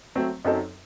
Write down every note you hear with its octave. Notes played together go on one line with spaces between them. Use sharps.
F#3 A3 C4
F#2 F#3 C4 D#4 A4